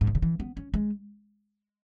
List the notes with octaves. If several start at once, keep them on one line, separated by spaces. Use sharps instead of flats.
G#2
B2
C#3
E3
B3
C#4
G#3